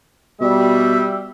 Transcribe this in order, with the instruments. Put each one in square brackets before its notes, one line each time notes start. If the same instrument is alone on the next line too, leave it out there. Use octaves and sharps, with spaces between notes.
[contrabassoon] B2 [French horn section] G3 [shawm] E5